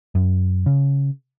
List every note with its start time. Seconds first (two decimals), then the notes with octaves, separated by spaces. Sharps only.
0.15 F#2
0.66 C#3